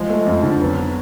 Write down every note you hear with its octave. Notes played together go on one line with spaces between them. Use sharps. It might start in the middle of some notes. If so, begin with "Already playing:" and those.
Already playing: F3 G#3
A3
F2
D3
F#3 B3